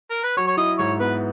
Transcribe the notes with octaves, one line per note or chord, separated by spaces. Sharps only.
A#4
B4
F#3 C#5
C#5
E4 D#5
G#2 C#5
B3 B4